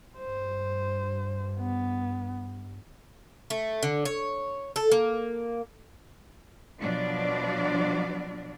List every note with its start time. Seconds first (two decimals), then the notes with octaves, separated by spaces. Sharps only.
0.19 G2 C5
1.60 B3
3.50 A3
3.83 D3
4.05 C#5
4.76 A4
4.91 A#3
6.79 B2 F3 F#3 D4 D5